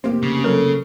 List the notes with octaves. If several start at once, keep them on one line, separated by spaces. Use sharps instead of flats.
F1 A#3 C4 G4
C#3
F#3 A4 A#4